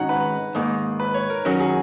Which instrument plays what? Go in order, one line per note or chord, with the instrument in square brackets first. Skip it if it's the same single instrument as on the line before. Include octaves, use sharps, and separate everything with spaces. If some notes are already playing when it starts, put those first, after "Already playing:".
Already playing: [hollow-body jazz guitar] G#2 D#3 G#3 C#4 F#4 [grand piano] F#5 A#5
[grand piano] B4
[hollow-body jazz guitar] G#2 D#3 A#3
[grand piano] B4
C#5
A#4
[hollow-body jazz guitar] D#3 F#3 C#4 F#4 [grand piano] A#4
[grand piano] G#4